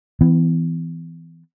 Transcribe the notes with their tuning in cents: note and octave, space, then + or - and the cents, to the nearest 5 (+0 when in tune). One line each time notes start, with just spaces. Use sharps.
E3 +0 B3 +40